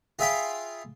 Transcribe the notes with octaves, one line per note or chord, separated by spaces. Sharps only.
F4 G#4 E5 F5 G5 B5